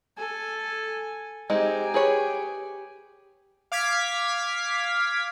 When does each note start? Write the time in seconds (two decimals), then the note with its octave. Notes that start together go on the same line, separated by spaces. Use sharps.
0.17 A4 G#5
1.50 G#3 C4 D#4 G4 G#5
1.94 G#4 B4 C#5
3.72 F5 D6 F6 G#6 B6